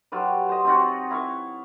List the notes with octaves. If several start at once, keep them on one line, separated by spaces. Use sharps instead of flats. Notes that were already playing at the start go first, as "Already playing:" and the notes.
F#3 F4 G4 B4
C5 D#5
C4 D#4 F4 F#4
E4 F5 C#6